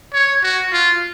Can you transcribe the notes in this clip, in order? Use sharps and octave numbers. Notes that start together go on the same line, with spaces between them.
C#5
F#4
F4